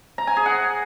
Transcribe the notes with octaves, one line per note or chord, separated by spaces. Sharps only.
A#5
G#5
G#4
F#5